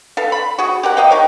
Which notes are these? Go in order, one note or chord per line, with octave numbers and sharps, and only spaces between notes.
A4 B4 F5
B5
F#4 G#4
G4 A#4 F#5
D#5 F5 G5
D#4 G4 A#4 C#5